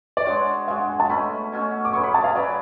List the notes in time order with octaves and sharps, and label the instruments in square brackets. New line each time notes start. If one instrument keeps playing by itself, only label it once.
[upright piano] D5
[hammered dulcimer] G#3 D4 F#4 [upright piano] C#5
[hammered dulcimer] G#3 D4 F#4 [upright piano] F5
[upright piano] F#5
G#5
A5
[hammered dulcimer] B2 A3 C#4 F#4 [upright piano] B5
[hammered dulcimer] B2 A3 C#4 F#4
[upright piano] D6
[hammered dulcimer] F#3 C#4 G#4 B4 [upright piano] C#6
[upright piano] B5
A5
F5
[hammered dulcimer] F#3 C#4 G#4 B4 [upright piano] D5